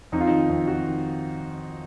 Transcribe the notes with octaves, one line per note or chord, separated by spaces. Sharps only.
F2 D#4
F4
D#3 D#4
F2
F2 F#4
D#3